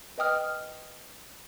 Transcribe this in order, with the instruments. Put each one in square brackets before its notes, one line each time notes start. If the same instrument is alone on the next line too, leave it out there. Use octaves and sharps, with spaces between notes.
[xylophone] B4 D#5 G5 D#6 F6